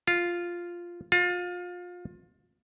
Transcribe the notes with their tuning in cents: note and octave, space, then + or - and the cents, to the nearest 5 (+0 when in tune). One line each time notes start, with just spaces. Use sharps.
F4 -5
F4 +25